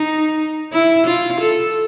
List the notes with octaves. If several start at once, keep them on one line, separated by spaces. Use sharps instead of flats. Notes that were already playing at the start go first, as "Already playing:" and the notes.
Already playing: D#4
E4
F4
A4